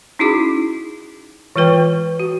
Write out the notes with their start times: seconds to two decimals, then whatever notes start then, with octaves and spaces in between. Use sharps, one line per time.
0.19 C#4 D#4 E4 F#4 G#4 D6
1.56 E3 G#3 F4 B4 G5
2.20 F#4